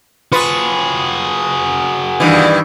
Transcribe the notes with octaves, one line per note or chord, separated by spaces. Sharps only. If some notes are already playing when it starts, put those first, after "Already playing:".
F4 F#4 G#4 B4
G2 D#3 E3